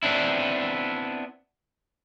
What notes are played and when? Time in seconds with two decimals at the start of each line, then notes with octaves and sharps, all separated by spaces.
0.03 B3 C4 D4 E4